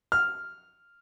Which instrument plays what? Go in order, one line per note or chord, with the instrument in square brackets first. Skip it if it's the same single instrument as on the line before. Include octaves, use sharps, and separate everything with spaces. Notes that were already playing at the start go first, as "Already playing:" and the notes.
[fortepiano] F6